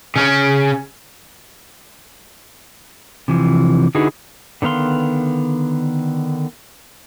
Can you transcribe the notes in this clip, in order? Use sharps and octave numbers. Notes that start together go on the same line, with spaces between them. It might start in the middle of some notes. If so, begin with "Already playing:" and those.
C#3 C#4
C3 E3 F3
D3 D#4 E4 F#4 G#4 B4
D3 D#3 B3 F5 C6